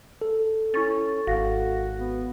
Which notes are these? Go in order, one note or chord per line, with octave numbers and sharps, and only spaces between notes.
A4
C#4 E4 C#6 A6
G#1 F#4 F5 A#6
B3